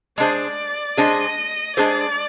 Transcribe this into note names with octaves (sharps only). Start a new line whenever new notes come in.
G#3 D4 G#4 C5 D5
G#3 D4 G#4 C5 D#5
G#3 D4 G#4 C5 D5